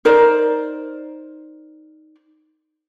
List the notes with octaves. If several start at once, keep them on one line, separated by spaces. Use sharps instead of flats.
D#4 A#4 C5 D5